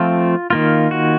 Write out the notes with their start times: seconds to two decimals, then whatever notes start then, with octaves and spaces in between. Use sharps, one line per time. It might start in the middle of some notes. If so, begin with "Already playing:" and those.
Already playing: F3 A3 C4 F4
0.50 D#3 A#3 F4
0.91 F#4